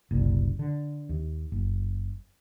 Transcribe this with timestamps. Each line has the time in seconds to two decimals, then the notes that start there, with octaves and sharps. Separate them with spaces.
0.11 F#1 C2 A#2
0.59 D3
1.09 D#2
1.52 F#1